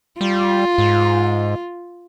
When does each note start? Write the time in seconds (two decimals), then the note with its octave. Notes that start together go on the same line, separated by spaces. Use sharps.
0.21 G3 F4
0.78 G#2